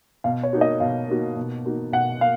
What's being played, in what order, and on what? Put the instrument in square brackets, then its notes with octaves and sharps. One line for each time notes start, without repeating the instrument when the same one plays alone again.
[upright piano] B2 [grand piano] F5
[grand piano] C#5
[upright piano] A#3 D#4 F#4
[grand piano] D#5
[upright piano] B2 [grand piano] F5
[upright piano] A#3 D#4 F#4
B2
A#3 D#4 F#4
[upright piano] B2 [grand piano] F#5
[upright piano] A#3 [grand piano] F5